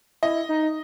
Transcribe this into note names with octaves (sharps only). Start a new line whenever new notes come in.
E4 D#5
D#4